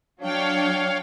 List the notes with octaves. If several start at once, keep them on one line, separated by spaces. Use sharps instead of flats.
F#3 D4 C#5 F5 G5